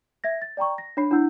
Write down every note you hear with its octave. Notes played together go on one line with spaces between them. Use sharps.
E5 G#6 A#6
A6
D5 G5 A#5 C#6
A#6
D4 C#5 B5 C7
D4 E4 F#5 E6 G6